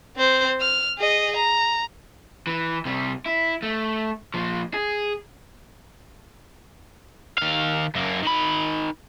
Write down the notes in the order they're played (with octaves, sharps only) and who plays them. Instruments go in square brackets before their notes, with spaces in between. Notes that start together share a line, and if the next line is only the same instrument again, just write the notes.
[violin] C4 C5
F6
G#4 D#5
A#5
[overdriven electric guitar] E3
C3 G3
E4
A3
A#2 F3
G#4
D#3 F5
F#2 A#3
D#3 B5